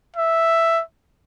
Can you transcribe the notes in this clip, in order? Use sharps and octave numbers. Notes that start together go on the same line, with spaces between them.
E5